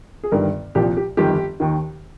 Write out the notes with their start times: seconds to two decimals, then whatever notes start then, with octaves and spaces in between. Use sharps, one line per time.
0.24 G#4
0.31 G1 G2 D#3 A#4
0.75 C2 A#2 F3 G4
0.97 G4
1.17 G1 F2 D#3 G4
1.60 D#2 D#3